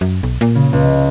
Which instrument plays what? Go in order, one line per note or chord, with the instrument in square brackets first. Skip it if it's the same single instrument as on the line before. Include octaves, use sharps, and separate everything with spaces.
[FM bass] F#2
B1
A#2
[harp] C#3
C#2